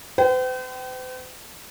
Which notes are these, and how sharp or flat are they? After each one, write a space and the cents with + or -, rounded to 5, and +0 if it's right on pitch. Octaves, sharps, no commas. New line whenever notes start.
C5 -45 G5 -30